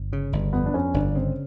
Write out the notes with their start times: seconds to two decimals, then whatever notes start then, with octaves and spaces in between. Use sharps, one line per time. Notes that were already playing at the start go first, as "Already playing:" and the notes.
Already playing: G1
0.13 C#3
0.33 G1
0.53 F2 B3
0.66 D4
0.74 F2 C#4
0.94 G1 D4
1.15 C#3 C4